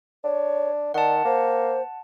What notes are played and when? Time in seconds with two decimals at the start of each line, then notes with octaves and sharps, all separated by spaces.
0.24 D4 C#5
0.94 D#3 D5 F#5 A5
1.25 A#3 C5